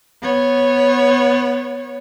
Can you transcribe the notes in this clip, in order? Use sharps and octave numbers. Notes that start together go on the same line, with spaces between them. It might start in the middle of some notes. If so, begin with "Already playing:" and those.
B3 C#5